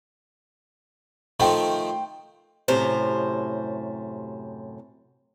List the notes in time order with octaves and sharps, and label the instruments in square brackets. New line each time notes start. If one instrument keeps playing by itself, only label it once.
[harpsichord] D#3 F3 A3 [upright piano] C5 G5
[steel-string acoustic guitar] F#2 A2 C3 C5 C#5